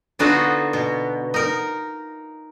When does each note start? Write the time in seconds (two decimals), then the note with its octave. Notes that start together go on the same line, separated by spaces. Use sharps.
0.19 D3 B3 D#4 F4 F#4 A4
0.73 B2
1.34 D#4 A#4